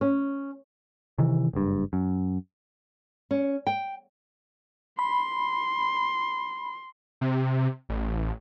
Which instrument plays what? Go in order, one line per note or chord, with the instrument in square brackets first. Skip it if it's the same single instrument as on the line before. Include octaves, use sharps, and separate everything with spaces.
[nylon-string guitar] C#4
[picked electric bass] C3 D#3 E3
F#1 G2
F#2
[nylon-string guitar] C#4
G5
[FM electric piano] B5 [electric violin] C6
[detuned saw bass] C3
A1